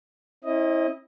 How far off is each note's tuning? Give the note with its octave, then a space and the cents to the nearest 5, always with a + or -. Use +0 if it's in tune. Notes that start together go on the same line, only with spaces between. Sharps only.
C4 +45 E4 -20 D#5 +0